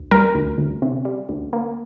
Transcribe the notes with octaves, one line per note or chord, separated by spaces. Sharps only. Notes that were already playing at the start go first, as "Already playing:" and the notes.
Already playing: D2
G3 A#4
D2
D2
C3
G3
D2
A#3